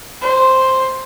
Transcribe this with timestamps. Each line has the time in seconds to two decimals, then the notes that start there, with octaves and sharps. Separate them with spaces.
0.22 C5